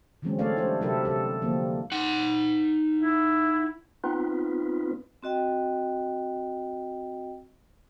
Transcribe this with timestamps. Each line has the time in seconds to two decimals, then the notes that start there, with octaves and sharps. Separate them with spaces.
0.22 D3 E3 F#3 G#3 C4 C#4
0.39 A3 C4 A4 C#5 D5 F5
0.56 G3 D4 E4 C5
0.81 C3 F#3 E4 G4 A4 A#4
1.05 C3 A4
1.42 D3 F3 G3 A#3 C4
1.92 D#4 F#5
2.98 E4
4.04 B3 C4 D#4 F4 B4
5.23 C4 F#4 D#5 G5